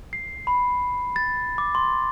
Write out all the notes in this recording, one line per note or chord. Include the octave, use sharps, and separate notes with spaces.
C7
B5
A6
D6
C6